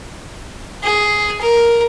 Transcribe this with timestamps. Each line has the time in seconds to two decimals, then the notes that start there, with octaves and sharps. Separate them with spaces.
0.84 G#4
1.41 A#4